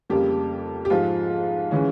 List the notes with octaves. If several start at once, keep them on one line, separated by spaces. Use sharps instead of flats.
F2 C#3 G3 A#3 G4
G4
G#2 F3 G#3 F4
C#3 E3 G#3 C#4